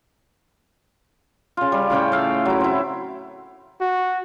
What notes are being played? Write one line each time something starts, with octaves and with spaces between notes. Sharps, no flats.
C#3 F4
G3
A2 C#3 G5 C#6
A3 F5
F#3 E4
C4 E4
F#4